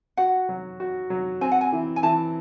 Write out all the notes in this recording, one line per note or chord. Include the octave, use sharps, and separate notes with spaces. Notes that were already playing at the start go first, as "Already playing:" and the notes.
F#4 F#5
F#3
F#4
F#3
C4 G#5
F#5
G#5
E3
G#5
E3 A5